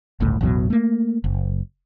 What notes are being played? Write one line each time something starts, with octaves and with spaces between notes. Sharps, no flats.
G1 C#2 A2
A1 E2 B2 F#3
A3 A#3
F#1